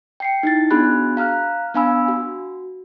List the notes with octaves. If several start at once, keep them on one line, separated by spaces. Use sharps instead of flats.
G5 C7 C#7
D#4 E4 A6
B3 D4 F#4 G#4 B5 F#6
F5 A#5 F6 F#6
B3 D4 F5 G#5 B5 E6
F#4